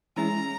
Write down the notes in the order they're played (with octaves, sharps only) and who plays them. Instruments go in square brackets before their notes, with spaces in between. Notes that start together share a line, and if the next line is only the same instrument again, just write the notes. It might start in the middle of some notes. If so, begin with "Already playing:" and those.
[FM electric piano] E3 G#3 C#4 E4 G#4 [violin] A#5